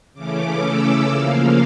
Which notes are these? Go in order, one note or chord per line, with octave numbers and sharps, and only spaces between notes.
C#3 E3 A3 C#4 D6
E6
C#3 F3 A#3 F5